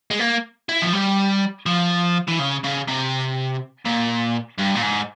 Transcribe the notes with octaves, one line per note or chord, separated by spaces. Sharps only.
G#3
A#3
E4
F3
G3
F3
E3
C#3
C#3
C3
A#2
G2
A#2
G#2